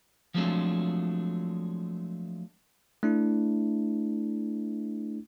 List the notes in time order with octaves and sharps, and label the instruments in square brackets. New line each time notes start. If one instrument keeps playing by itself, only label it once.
[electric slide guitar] F3 F#3 G#3 A3 C4 D4
[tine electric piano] A3 D4 E4